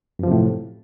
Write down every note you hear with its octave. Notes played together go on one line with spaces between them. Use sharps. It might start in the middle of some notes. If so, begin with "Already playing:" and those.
F#2 A2 C3 F3